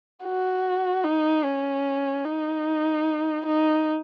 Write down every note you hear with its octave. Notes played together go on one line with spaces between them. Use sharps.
F#4
D#4
C#4
D#4
D#4